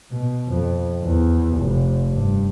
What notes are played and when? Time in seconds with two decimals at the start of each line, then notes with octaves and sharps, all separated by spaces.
0.11 B2
0.48 F2
1.03 E2
1.58 F1
2.08 G2